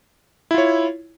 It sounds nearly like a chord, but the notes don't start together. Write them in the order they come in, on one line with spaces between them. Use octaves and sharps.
E4 F4 C#5